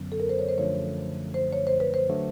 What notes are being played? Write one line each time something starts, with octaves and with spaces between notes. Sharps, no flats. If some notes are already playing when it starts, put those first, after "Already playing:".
Already playing: F#2 D3 F#3 B3
A4
A#4
C5
C#5
C5
F#2 D3 F3 A3 C#5
C5
C#5
C5
B4
C5
D3 F#3 A3